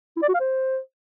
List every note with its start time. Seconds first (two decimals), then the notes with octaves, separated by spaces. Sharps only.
0.16 E4
0.22 D5
0.28 F#4
0.34 F5
0.40 C5